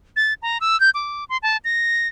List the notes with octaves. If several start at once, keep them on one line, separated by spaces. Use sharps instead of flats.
A6
A#5
E6
G6
D6
C6
A5
A#6